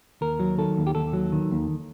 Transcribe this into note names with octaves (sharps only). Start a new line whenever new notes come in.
D#2 A#4
F#3
D#3 A4
D#2
G4
D#2 A4
F#3
D#3
D#2